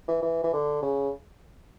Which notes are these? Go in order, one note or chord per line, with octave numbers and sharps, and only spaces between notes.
E3
E3
E3
D3
C#3